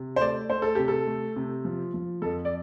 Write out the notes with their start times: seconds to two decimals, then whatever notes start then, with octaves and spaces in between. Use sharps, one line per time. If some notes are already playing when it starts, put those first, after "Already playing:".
Already playing: C3
0.16 C5
0.20 A3 D5
0.49 A3 C5
0.62 A4
0.75 C3 G4
0.88 A4
1.07 A3
1.36 C3
1.65 F3
1.94 F3
2.22 F2 A4
2.45 D5